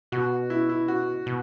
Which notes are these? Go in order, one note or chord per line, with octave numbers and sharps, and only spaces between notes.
B2 F#4
E4
E4
F#4
B2